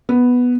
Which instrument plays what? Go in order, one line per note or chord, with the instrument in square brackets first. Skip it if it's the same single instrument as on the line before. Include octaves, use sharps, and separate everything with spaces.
[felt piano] B3